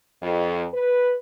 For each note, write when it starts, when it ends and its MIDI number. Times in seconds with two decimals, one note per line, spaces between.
0.22 0.65 41
0.73 1.15 71